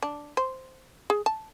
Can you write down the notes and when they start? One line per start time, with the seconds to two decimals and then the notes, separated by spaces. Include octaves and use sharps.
0.03 D4
0.37 C5
1.10 G#4
1.26 A5